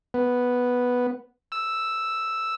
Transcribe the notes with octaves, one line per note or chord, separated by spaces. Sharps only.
B3
E6